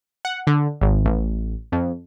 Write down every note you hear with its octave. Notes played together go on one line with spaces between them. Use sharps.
F#5
D3
G#1
A1
F2